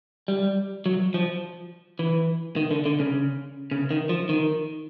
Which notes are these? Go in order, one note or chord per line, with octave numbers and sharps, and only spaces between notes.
G3
F#3
F3
E3
D#3
D3
D3
C#3
C#3
D#3
F3
D#3